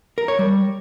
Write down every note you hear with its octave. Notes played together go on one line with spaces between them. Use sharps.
A#4
C#5
G3